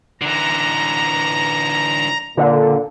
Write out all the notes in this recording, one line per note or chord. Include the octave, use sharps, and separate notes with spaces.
D3 E3 A#5
A#2 D3